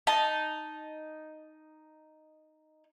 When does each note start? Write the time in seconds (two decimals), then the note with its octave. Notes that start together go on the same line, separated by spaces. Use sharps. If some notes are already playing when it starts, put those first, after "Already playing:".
0.07 D#4 A5